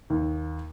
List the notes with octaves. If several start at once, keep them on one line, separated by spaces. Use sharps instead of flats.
D#2